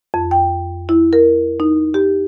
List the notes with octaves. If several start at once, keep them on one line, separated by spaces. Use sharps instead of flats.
F2
G5
E4
A#4
D#4
G4